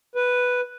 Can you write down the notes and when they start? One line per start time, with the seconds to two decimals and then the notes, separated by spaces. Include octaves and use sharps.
0.15 B4